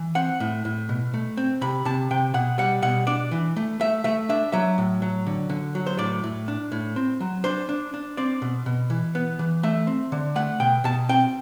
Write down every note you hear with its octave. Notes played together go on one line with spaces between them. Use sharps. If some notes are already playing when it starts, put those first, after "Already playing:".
Already playing: E3
C4 F#5
A2
A2
B2
A3
C4
C3 B5
C3 A5
C3 G5
B2 F#5
G3 F#5
B2 F#5
D4 D5
E3
A3
A3 E5
A3 E5
D4 E5
F#3 E5
A2
F#3
D3
D3
F#3
C5
A2 D5
A2
D4
A2
C4
F#3
D4 C5
D4
D4
C4 D5
B2
B2
E3
B3
E3
A3 E5
C4
D3
A3 F#5
B2 G5
B2 A5
C4 G5